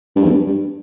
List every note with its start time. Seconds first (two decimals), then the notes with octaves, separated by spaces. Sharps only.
0.16 G2
0.24 E2
0.31 G2
0.47 G2